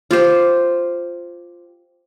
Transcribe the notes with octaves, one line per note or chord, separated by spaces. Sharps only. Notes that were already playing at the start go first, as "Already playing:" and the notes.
F4 G4 C5